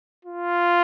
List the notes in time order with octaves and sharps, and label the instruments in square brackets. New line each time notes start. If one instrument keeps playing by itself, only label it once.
[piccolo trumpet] F4